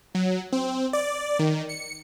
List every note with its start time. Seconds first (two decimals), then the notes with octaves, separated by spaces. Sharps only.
0.15 F#3
0.53 C4
0.93 D5
1.39 D#3
1.69 C#7